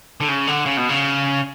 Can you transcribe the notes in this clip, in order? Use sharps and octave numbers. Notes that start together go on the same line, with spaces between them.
D3
C#3
D3
C#3
B2
C#3